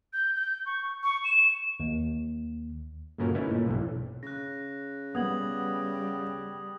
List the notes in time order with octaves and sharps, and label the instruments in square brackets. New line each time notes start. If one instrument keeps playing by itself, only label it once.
[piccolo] G6
G6
C#6
C#6
E7
[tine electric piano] D#2
[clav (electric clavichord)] G1 A#2 C#4 F#4 A#4
A3 C#4 D#4 E4 A#4 B4
A#2
B1 E2 G2 E3
[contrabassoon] C#3 [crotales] F#6 A#6
[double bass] G3 [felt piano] B3 [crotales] D#6 G#6 F#7